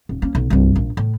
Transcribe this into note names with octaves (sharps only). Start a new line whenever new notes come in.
D#1
A#3 C#4
B1
C2 G2
A#1
A2